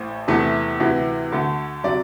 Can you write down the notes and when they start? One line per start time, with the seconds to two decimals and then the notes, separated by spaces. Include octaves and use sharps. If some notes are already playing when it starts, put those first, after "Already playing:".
Already playing: A1 A2 C5
0.28 E2 C3 E3 A3
0.80 D2 C3 E3
1.32 D2 D3 A3
1.84 C3 F#3 D5